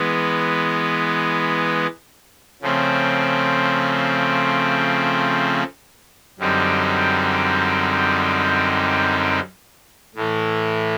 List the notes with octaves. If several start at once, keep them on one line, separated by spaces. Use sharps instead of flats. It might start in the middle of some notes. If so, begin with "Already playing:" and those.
Already playing: E3 G#3 B3
C#3 F3 A3 C4
F#2 D3 G3 C4 D#4
A2 E3 A3